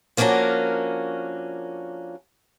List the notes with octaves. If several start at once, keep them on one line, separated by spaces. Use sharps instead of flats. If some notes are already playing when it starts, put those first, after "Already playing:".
F3 A#3 C#4 D4 F#4 A#4